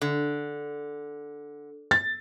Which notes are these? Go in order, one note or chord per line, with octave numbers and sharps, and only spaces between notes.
D3
A6